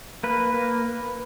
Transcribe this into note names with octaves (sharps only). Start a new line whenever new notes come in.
A#3 B4
A#3